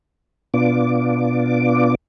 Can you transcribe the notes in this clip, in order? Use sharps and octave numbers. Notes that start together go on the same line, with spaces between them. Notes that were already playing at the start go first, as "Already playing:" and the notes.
B2 B3 D4 F4 D6